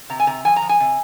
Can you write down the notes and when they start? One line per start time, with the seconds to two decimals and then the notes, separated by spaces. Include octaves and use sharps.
0.10 C3 A#5
0.20 G#5
0.27 C3 A#5
0.45 F3 G#5
0.56 A#5
0.62 F3
0.69 G#5
0.80 C3